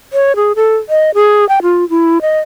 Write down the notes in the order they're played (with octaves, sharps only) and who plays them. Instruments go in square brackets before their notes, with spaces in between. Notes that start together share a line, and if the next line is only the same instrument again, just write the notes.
[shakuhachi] C#5
G#4
A4
D#5
G#4
G5
F4
E4
D#5